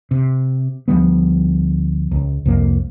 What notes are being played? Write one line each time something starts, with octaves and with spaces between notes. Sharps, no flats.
C3
D2 F3 G3 B3
C#2
C2 F2 A#3